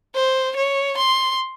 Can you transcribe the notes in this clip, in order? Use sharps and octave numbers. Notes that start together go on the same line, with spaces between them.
C5
C#5
C6